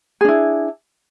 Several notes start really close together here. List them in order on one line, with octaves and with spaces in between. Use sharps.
G#4 D4 E4